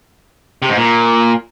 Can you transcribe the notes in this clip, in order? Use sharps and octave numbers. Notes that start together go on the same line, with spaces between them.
C3
G#2
A#2